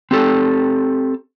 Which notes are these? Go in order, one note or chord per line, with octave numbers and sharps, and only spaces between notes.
C4 G4 A4